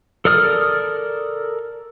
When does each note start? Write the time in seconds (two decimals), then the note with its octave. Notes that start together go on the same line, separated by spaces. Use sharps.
0.25 A4 A#4 D5 D#6 F6